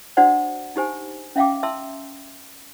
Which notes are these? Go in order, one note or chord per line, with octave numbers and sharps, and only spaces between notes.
D4 F#4 C5 D5 F#5
D#4 G4 C5 G#5
C#4 E5 F5 G5 D6
E5 A5 C6 E6